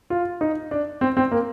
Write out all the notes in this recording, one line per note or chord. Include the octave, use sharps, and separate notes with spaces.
F4
D#4
D4
C4
C4
A#3